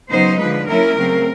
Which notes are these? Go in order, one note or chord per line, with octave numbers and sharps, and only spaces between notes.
C#3 F#3 B3 D#4 C5
D3 F3 G#3 B4
F#3 A#3 C#4 E4 A#4
C#3 F#3 A3 C4